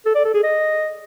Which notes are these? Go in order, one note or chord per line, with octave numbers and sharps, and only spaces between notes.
A4
D5
A4
G#4
D#5